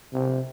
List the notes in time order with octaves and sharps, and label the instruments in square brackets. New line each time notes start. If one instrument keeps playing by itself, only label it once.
[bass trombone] C3